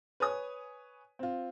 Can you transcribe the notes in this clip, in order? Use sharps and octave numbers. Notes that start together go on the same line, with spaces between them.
B4 C#5 G#5 D#6
C4 F4